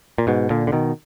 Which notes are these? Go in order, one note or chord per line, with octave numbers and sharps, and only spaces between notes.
A#2
G#2 B2
A#2 D3
D3
B2 D#3